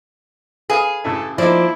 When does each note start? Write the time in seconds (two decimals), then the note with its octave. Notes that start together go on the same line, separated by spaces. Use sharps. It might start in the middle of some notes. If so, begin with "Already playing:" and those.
0.70 G#4 B4 F5 D#6
1.04 A1 C#3 E4 A4
1.38 F3 A#3 D#4 E4 C5 D5